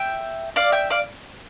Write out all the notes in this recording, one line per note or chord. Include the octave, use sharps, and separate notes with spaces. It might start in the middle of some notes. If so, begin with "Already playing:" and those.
Already playing: E5 G5
D5 F5
E5 G5
D5 F5